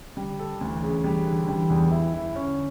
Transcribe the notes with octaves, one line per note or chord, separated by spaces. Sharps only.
D3 G3
A4
D2 E3
C#3
G3
D3
E3 G3
E2
E4
E4
D3 C#4